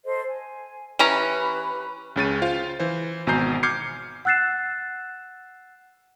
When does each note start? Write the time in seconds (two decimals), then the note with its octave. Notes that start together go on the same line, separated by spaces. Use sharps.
0.05 A4 C5 D#5
0.28 G#5
0.99 E3 C#4 G4 B4 A#5 B5
2.16 C#2 C#3 A6 D#7
2.42 F4 C5 F5
2.80 E3 C5
3.27 G#1 B2 G#5 A#5 G6 C7
3.63 D6 F6 G6 G#6 C7 C#7
4.25 F#5 E6 F#6 A6 C7 E7